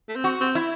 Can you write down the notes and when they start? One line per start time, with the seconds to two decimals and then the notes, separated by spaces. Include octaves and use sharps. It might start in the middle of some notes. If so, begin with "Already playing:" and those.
0.08 A3
0.16 C4
0.24 F#4
0.41 C4
0.55 E4